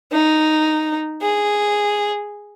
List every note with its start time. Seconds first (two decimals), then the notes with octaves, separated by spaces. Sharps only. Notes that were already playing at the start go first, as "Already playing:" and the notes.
0.12 D#4
1.22 G#4